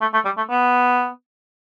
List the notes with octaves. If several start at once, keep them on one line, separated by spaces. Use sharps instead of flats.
A3
A3
G3
A3
B3